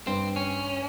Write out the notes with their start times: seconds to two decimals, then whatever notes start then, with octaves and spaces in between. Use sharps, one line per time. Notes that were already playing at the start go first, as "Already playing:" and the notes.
0.06 G2 C4
0.36 C#4